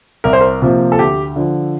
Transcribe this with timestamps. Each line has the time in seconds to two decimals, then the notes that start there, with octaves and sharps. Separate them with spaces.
0.24 C2 A#4
0.33 C5
0.41 A#4
0.62 C3 F3 A#3
0.92 A4
0.99 D2 G4
1.36 D3 F3